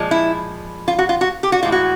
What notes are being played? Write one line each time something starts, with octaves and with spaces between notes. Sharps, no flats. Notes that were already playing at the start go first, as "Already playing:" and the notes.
Already playing: A#2 F3 G#3
E4
F4
F#4
F4
F#4
G4
F#4
A2 E3 G#3 F4
F#4